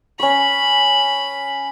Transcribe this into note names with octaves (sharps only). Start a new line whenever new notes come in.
C#4 B5 C#6